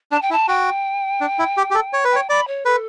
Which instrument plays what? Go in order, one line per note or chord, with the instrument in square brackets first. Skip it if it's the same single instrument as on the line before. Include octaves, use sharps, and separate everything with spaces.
[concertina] D4 [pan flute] A5
[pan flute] G5
[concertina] E4 [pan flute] A5
[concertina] F#4 [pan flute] G5
[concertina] D4
E4
G4
G4
A4
C#5
B4
[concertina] C#5 [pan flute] G5
[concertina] D5 [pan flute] B5
[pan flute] C#5
[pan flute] A4 [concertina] B4